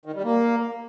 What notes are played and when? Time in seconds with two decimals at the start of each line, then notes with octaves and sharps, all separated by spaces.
0.06 D#3
0.15 G3
0.24 A#3